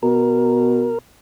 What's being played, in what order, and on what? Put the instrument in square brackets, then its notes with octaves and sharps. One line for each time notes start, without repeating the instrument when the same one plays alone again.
[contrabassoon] B2 [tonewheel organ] A#4